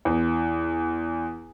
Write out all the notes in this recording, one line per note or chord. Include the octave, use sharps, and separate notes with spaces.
E2